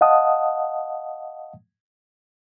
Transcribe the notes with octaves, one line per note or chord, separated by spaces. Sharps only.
D#5 F5 F#5 A5 D#6